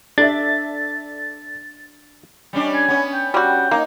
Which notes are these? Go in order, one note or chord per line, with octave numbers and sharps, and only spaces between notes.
D4 A4 D5 E5 A6
G3 C#4 D4
G#5
B3 C#4
G5
G3 F#4 G5
A#3 D#4